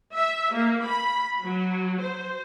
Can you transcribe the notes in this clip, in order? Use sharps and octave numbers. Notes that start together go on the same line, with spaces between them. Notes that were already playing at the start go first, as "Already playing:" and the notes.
E5
A#3
B5
F#3
C5